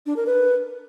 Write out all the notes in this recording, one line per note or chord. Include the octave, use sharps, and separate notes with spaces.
D4
A#4
B4